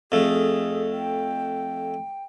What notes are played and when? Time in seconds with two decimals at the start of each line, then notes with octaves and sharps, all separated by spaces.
0.12 F2 A3 G#4
0.92 G5